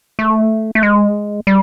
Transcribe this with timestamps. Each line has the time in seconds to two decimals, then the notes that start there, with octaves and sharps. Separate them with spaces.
0.19 A3
0.75 A3
0.83 G#3
1.47 G3